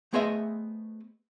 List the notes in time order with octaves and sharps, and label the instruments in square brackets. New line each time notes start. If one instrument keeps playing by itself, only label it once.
[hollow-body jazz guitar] A3 B3 G#4 C5 D#5 E5